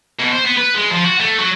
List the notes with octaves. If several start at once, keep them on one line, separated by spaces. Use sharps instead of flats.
B2
C5
B3
B4
G#3
F3
F#4
A3
F#3